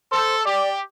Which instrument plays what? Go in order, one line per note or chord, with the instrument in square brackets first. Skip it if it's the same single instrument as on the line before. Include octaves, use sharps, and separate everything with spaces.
[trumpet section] A4 [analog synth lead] C5
[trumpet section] G4 [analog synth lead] D5